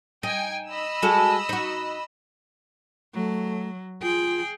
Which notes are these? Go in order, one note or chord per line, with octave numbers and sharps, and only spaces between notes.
D#4 G5 G#5
D#5 B5 E6
G#3 F#4 A4
D#4 F#4
F#3 A3
F4 G#4 G5